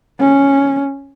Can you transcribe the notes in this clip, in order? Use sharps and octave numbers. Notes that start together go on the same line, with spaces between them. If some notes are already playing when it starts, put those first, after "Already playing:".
C#4